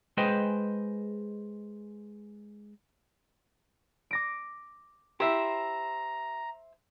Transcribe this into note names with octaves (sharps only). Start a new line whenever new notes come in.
G#3 G#4 B4 C5 D#5 G5
D6 A#6 D7
E4 G4 C5 E5 A#5